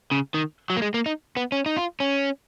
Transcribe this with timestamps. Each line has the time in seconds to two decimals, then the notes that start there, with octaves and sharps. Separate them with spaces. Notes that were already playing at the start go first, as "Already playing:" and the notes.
0.11 C#3
0.34 D#3
0.70 F#3
0.77 A#3
0.82 G#3
0.94 A#3
1.06 D#4
1.37 B3
1.52 C#4
1.66 D#4
1.77 F4
2.00 C#4